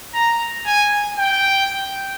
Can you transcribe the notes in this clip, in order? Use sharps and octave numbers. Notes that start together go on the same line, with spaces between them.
A#5
G#5
G5